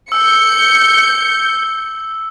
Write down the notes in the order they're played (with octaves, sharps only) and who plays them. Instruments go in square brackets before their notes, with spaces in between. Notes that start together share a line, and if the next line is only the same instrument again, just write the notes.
[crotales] E6 [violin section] G6 C#7